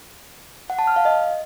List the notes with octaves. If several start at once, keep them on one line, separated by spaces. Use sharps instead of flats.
F#5
A5
F6
F5
D#5